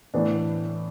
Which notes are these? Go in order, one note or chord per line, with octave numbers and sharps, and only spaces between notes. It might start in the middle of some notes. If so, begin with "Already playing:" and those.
A2 E3 B3 D4